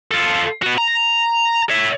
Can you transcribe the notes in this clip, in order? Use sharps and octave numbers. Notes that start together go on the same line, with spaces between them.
F4 A4
B3 F#4
A#5
C#5 E5